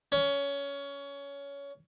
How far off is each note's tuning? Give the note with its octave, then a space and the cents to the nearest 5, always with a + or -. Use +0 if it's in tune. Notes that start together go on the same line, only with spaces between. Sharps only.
C#4 +20